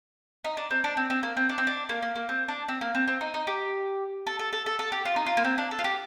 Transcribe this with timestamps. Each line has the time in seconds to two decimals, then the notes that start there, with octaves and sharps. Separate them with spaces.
0.44 D#4
0.57 D4
0.71 C4
0.84 D4
0.97 C4
1.10 C4
1.23 A#3
1.37 C4
1.49 D4
1.58 C4
1.67 D4
1.89 A#3
2.02 A#3
2.16 A#3
2.29 C4
2.48 D4
2.68 C4
2.81 A#3
2.95 C4
3.08 C4
3.21 D#4
3.34 D#4
3.47 G4
4.27 A4
4.39 A4
4.53 A4
4.66 A4
4.79 A4
4.92 G4
5.05 F4
5.16 D#4
5.26 F4
5.37 A#3
5.45 C4
5.58 D4
5.71 A4
5.79 F4
5.84 G4